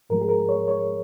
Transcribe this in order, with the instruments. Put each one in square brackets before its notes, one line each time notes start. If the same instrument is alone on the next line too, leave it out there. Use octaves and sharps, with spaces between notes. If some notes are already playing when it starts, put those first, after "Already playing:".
[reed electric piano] G#2 F3 G#3 A#4
G#4
A#4
C#5
C#5